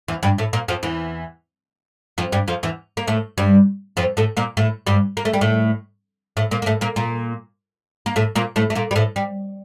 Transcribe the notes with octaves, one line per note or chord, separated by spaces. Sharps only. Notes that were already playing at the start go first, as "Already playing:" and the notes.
E2 E3
G2 G3
A2 A3
A#2 A#3
F2 F3
E2 E3
F2 F3
G2 G3
F2 F3
E2 E3
A#3
A2 A3
G2 G3
F2 F3
A2 A3
A#2 A#3
A2 A3
G2 G3
A#3
A3
G3
A2 A3
A2 A3
A#2 A#3
A#3
A2 A3
A#2 A#3
A#2 A#3
A#3
A2 A3
A#2 A#3
A2 A3
A3
A#2 A#3
G3
A2 A3
G3